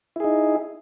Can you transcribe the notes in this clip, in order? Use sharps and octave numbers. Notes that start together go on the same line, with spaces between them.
D#4 E4 G#4